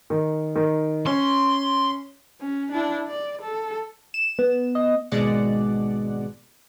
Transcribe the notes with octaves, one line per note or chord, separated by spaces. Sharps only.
D#3
D#3
C#4 C6
C#4
D4 E4
D5
A4
E7
B3
D#5
G#1 B2 G#3 D5 F#5